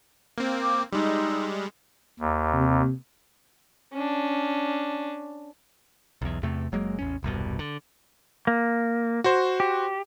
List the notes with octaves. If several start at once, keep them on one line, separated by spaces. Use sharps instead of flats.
A#3 C4
D6
G3 G#3 D#4 C6 E6
D#2
C3
C#4 D4
B1 E2
E2 C3 A3
F#1 F#3 G#3 A#3
A1 E2 C#4
E1 C2 G2 B2
D3
A#3
F#4 C5
G4